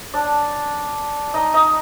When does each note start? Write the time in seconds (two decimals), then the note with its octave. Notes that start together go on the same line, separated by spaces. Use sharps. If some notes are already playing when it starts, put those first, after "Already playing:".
0.14 D4 D5
1.34 D#4 D#5
1.54 D#4 D#5